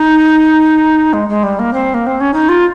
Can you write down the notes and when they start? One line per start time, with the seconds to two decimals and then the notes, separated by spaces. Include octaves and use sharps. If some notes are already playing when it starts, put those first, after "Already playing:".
Already playing: D#4
1.13 G#3
1.29 G#3
1.43 G3
1.59 A#3
1.73 C4
1.94 A#3
2.07 C4
2.20 C#4
2.34 D#4
2.49 F4